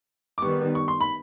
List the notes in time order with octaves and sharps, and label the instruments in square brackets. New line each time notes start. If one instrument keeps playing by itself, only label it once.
[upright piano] D6
[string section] D#3 G3 B3 [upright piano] C#6
[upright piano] C#6
C6
B5